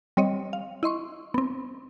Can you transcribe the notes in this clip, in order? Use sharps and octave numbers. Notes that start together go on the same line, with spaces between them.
G3 C4 C#5 D#5
F5
E4 D#5 C6 C#6
B3 C4